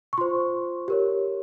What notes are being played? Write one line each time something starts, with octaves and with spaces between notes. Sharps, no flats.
C#6
F4 C5 C6
G4 A#4 C#5